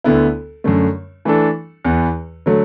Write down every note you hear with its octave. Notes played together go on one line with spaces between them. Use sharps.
D2 D3 B3 E4
F#2 D3 A3
E3 A3 D4 A4
E2 E3 B3
D3 F#3 A3